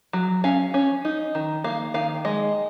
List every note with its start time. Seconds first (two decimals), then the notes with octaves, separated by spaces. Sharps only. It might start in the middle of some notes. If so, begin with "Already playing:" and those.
0.13 F#3
0.44 C#4 F5
0.74 C#4
1.05 D#4
1.35 D#3
1.64 A#3 F5
1.94 D#3 F5
2.25 G#3 D#5